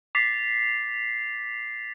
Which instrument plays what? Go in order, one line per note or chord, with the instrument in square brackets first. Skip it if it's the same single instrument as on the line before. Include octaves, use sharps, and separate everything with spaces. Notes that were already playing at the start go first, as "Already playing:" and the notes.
[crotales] D6 A6 B6 C7